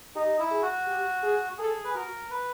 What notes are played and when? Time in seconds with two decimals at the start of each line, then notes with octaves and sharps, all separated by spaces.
0.15 D#4 G4
0.40 E4
0.51 G#4
0.62 F#4
0.87 G4
1.23 G#4
1.58 G#4 A4
1.85 B4
1.95 F#4 A#4
2.31 B4